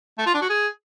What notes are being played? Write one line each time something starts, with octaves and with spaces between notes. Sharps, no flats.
A3
F4
D4
F#4
G#4